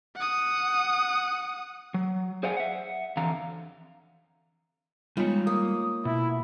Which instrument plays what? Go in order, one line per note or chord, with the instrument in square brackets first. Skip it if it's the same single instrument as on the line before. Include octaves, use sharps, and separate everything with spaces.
[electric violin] F#5 D#6
[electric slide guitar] F#3
G#4 C5 D5 F5 F#5 G#5
E5 F#5
F2 D3 E3 F5 A#5
[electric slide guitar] G3 C#5 [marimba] G#3 B3 [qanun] D#4 F4
[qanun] A#3 [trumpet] D#6
[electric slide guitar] B2 [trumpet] E4